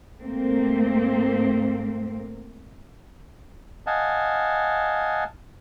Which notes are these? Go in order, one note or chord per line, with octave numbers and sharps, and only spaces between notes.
G#2 A3 A#3 C4
D#5 F5 F#5 G#5 A5